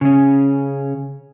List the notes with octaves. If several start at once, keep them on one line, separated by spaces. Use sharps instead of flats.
C#3 C#4